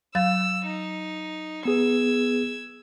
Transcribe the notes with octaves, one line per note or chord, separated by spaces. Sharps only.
F#3 F5 E6 A6
D#4
B3 G#4 B4 E6 G#6